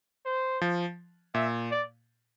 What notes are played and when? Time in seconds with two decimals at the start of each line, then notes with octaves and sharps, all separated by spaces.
0.26 C5
0.62 F3
1.34 A#2 E5
1.71 D5